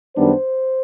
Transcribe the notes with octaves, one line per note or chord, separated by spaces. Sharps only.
F#2 D#3 G3 B3 D4 C5